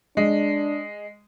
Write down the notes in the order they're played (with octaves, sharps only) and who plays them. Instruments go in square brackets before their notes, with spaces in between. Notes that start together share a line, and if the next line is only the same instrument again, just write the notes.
[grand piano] G#3 [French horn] D4